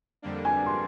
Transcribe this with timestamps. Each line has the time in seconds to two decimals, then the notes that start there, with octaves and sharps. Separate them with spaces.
0.22 F2 D3 G3 A#3 D4
0.45 G#5
0.66 C6